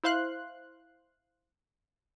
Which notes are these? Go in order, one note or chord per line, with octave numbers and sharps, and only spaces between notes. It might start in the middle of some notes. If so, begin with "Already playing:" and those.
E4 C5 F5 C6 F#6